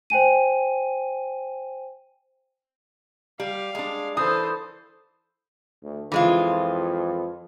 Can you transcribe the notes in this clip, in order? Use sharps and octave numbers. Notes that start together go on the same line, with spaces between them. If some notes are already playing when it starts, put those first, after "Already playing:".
C5 G5 G#5 D#7
G3 F5
G#3 D4
E3 A4 C5 D#6
D2
F2 E3 G#3 F4